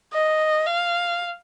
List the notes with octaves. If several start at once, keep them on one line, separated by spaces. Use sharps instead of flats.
D#5
F5